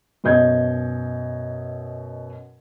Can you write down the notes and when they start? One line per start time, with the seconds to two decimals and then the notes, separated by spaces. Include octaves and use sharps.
0.24 F#2 B2 D#5 G6 G#6